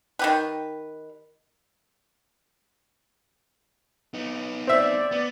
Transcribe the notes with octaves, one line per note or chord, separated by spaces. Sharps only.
D#3 G4 B4
B3 D#4
C4 D5 E5
B3